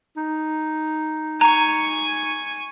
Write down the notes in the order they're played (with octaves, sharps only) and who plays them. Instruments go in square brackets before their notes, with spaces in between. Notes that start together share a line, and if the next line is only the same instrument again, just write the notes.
[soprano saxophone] D#4
[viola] G#5 C#6 [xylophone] A#5